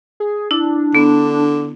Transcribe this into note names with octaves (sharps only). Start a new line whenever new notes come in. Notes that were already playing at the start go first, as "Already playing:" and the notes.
G#4
D4 E4
D3 B3